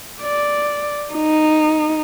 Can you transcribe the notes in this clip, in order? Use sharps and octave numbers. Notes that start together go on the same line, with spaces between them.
D5
D#4